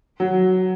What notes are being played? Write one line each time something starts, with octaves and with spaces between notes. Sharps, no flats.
F#3